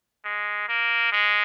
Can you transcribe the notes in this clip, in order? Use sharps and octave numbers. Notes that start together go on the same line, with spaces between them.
G#3
A#3
G#3